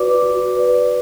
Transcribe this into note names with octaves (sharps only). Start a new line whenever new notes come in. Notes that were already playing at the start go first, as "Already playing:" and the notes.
Already playing: F#4 B4 D5 D6
F#4
B4 D5